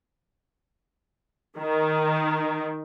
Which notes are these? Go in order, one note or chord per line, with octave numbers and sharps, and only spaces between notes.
D#3